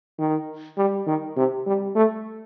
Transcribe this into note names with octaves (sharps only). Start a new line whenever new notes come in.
D#3
G3
D#3
C3
G3
A3